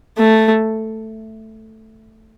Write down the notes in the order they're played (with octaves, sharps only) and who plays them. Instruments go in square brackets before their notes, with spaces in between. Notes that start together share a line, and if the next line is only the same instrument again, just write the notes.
[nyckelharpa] A3